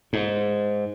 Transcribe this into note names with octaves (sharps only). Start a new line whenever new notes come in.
G#2